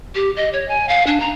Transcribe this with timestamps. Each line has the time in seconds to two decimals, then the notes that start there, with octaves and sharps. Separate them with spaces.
0.15 G4
0.36 D#5
0.53 C#5
0.68 G#5
0.89 F5
1.07 D4
1.20 A#5